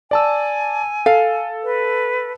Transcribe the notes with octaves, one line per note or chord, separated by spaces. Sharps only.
D5 G#5 A5 E6
A4 F5
B4